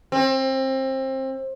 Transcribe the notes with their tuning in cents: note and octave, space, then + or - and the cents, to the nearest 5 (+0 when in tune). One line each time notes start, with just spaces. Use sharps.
C4 +25